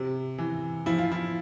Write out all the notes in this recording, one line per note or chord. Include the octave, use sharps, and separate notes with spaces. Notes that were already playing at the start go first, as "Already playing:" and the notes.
Already playing: C3
E3
F3 E4
F4
E4